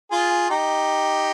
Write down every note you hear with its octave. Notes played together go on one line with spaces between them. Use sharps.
F4 G#4
D#4 G4